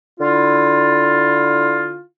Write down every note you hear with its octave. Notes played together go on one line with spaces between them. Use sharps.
D3 E4 F4